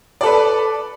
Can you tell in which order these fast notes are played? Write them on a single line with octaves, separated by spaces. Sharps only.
D5 A4 B4